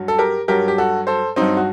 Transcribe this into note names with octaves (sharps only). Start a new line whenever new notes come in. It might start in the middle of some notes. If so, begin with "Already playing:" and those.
Already playing: G2 F#3
A4
G4 A#4
G2 F#3 G4 A#4
G4
F#4 A4
A4 C5
G2 F#3 C4 D#4
F#4